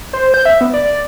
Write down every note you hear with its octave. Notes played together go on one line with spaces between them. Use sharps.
C5
G6
E5
B3
D5